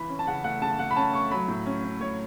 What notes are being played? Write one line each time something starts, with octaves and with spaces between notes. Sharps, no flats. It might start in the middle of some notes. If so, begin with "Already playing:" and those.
Already playing: E3 B5
C#4
A5
C#3 F#5
A3 F#5
C#3 A5
A3 F#5
B5
C#4 A5
A3 C#6
F#3 B5
A2
C#4
C#4
A2 C#5